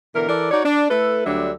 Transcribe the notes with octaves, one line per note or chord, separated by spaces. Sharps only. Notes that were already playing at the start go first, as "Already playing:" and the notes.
B2 D3 E3 A#4
E3 A4 A#4 D5
D#4 F#4 C#5 D5
D4
A3 E4 A4 B4
D2 D3 F#3 G3 D4 E5